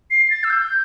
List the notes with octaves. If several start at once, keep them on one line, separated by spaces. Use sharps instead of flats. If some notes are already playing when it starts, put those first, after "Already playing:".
C7
C7
A6
E6
G6